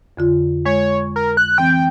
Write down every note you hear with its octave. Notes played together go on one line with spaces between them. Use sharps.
F2 D3 F4
G#3 C#5
A#4
F#6
E3 C4 G5